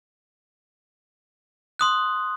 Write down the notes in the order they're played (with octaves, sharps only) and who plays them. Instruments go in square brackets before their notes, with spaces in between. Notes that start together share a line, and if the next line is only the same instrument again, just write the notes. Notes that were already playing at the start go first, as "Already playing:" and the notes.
[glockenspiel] C6 D#6 F#6